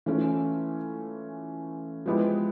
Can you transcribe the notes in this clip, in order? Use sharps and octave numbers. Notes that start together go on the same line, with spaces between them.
E3 A3 C#4 F4
F3 G#3 B3 E4 G4